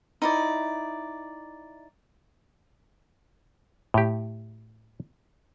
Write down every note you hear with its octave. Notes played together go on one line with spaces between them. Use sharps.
D#4 E4 D5
A2 G4